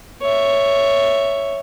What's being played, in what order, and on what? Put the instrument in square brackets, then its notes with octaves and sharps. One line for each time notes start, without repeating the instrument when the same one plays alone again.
[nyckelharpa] C#5 E5